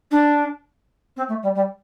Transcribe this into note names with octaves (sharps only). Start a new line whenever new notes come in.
D4
C4
A3
G3
G3